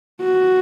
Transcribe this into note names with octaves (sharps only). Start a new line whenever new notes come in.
F#4